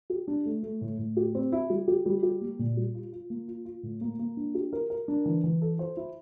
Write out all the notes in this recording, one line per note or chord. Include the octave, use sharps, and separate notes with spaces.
G4
D4
A3
A3
A2
A2
G4
C4
E4
G3
G4
G3
G4
A#3
A#2
G3
F4
F4
A#3
F4
F4
A2
A#3
A#3
D4
G4
A#4
A#4
D4
E3
E3
A4
C5
E4